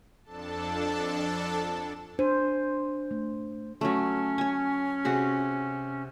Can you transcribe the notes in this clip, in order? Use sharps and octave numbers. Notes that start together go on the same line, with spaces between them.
F2 D4 A4 A5
D4 C5
A3
F#3 A3 C#4
C#5 G#5
C3 F#4 G#4